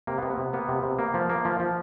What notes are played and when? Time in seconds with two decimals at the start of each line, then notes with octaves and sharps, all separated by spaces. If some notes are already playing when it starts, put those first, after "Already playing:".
0.07 C3 A#3
0.18 B3
0.23 C3
0.30 B3
0.38 C3
0.53 A#3 B3
0.69 C3
0.83 C3
0.99 A#3
1.14 F3
1.30 A#3
1.45 F3
1.60 F3